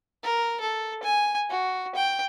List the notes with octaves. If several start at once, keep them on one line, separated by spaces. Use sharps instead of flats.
A#4
A4
G#5
F#4
G5